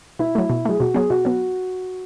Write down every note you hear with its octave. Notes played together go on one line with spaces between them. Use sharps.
B2 E4
F#3 A3
B2
F#3 A3 G#4
B2 F#4
F#3 B3 G#4
B2 F#4
F#3 B3